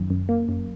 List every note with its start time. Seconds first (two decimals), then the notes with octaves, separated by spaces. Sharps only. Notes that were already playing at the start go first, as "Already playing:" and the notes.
Already playing: F#2 D#3
0.10 F#2
0.29 A#3
0.49 F#2